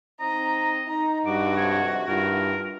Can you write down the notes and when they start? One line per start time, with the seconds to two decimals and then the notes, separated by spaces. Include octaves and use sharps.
0.20 C4 D#4 D#5 A#5
0.88 D#4 A#5
1.26 G2 F#4 D6
1.57 F2 G#2 C3 C#5
2.08 G2 D#3 E4 F4 A#4